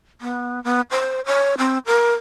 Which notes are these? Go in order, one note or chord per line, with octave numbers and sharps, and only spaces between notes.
B3
B3
C5
C#5
C4
A#4